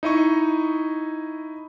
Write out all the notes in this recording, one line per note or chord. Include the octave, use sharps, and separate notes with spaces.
D#4 E4 D#5 C#6